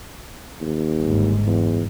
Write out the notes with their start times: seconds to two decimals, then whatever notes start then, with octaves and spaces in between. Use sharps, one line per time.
0.61 D#2
0.98 G1 G#2
1.46 E2